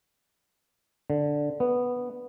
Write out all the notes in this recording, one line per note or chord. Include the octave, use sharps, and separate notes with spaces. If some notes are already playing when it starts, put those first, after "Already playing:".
D3
B3